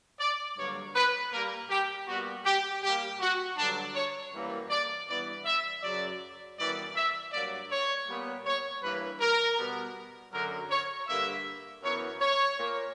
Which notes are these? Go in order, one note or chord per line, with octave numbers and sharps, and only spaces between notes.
D5
G2 D3 F#3 A#3 C#5
B4
A#2 G3 A#3 A#4
G4
A#2 G3 B3 F#4
G4
A#2 G3 A#3 G4
F#4
G2 D3 F#3 D4
C#5
F#2 E3 G3 A#3
D5
G2 E3 B3 D5
E5
F#2 C#3 F#3 D5
F#2 E3 G3 B3 D5
E5
G2 F#3 A#3 D5
C#5
A#2 G3 B3
C#5
G2 E3 A#3 B4
A#4
B2 G3 B3
F#2 D3 F#3 A#4
C#5
G2 D3 A#3 E5
F#2 E3 B3 C#5
C#5
A#2 A#3